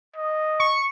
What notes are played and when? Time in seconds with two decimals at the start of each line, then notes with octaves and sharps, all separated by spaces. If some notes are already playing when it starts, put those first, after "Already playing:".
0.16 D#5
0.60 C#6